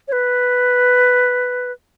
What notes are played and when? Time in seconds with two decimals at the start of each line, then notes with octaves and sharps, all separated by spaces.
0.08 C#5
0.12 B4